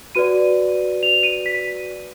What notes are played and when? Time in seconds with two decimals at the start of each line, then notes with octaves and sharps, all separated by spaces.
0.15 F#4 B4 D5 D#7
1.03 F7
1.23 D#7
1.46 B6